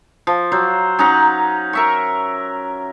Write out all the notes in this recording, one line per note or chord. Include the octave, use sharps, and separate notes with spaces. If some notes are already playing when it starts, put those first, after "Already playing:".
F3
F#3 C5
C#4 D#4 F#5 A#5
A#4 E5 C#6